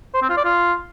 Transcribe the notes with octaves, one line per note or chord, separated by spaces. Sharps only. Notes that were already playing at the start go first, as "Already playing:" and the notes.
C5
C4
F4
D5
F4